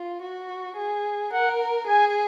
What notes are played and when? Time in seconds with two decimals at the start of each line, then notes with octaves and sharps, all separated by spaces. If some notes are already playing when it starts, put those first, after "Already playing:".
Already playing: F4
0.22 F#4
0.77 G#4
1.33 A#4 F#5
1.87 G#4 G#5